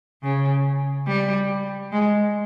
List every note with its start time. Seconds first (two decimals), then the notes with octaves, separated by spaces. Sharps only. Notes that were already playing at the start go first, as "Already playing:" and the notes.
0.23 C#3
1.07 G3
1.92 G#3